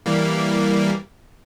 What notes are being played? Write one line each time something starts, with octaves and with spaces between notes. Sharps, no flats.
E3 G3 A#3